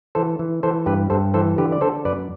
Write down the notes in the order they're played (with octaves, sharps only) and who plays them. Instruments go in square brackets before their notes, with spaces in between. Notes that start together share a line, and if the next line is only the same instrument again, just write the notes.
[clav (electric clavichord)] E3 A4 C5
E3
E3 A4 C5
G2 G4 B4
G2 A4 C5
E3 A4 C5
D3 G4 B4
D5
D3 A4 C5
F#2 B4 D5